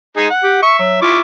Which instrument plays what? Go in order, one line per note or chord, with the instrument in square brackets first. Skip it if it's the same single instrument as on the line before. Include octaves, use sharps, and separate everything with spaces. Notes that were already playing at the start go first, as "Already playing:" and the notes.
[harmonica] G#3 D#4 G#4
F#5
[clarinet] G4
[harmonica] E5 [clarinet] C#6
[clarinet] F#3
[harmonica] E4 C#6 D6 [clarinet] F4